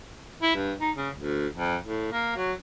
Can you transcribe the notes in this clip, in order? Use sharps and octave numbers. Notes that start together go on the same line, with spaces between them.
E4
G2
D#4
C#3
D2
F2
A2
A#3
F#3